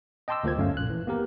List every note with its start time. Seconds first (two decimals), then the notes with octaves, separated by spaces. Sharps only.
0.28 D#5 G5 A5 C6 D6 E6
0.44 D2 A#3 F4 C5 G#6
0.57 G1 F#2 A3 C#4 F5
0.77 A#1 F#6
0.90 E3
1.07 A#3 B3 G4 A#4